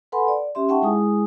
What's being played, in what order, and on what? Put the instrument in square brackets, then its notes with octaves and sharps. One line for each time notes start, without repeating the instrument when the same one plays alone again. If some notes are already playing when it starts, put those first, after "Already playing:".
[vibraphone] A4 B4 F#5 G#5 B5 C6
D5
C#4 G4 E5 C6
D#4 E5 F#5 G5 A5 C#6
G#3 E4 G#4 G#5 D#6